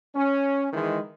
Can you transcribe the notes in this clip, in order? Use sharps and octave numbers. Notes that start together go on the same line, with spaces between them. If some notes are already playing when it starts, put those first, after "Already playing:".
C#4
D#3 E3 G#3